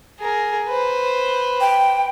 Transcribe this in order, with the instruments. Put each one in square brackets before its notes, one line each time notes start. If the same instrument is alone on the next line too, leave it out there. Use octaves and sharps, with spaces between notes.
[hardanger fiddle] G#4 A#4
B4 C5
[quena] G5